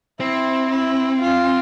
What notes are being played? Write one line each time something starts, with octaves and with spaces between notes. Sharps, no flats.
C4 E4
E4
F4